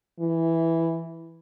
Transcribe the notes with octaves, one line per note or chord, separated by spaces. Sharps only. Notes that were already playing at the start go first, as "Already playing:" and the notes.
E3